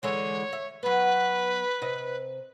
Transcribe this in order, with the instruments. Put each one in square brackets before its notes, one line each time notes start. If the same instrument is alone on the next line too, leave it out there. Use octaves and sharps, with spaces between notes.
[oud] D3 E3 G#3 [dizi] C#5
[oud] E5
[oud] F#3 B3 [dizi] B4
[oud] C3 D#5